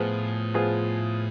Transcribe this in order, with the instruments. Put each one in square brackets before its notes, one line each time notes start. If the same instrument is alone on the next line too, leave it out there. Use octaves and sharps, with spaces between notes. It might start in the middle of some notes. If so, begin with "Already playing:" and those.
Already playing: [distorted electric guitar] A2 [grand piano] F3 B3 F4 G#4
[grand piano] F3 B3 F4 G#4